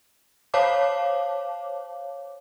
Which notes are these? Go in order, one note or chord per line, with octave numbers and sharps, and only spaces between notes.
C5 C#5 F5 A5 D6